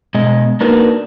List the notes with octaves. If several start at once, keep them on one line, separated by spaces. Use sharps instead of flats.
B2 G#3 D#5
A#3 D4 D#4 F#4 A#4 B4